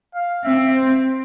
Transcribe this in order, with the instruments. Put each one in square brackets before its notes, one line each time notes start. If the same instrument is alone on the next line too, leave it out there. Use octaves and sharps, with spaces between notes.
[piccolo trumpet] F5
[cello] C4 [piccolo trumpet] E5
[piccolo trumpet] C5